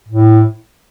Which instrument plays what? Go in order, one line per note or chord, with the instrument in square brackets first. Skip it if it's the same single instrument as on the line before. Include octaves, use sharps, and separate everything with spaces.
[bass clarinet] A2